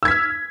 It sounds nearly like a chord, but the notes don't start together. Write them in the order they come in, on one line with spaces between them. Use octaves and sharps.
E6 G#6 B6 F6